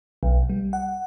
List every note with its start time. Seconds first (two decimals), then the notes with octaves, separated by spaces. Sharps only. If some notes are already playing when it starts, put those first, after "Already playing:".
0.23 B1
0.49 G3
0.73 F#5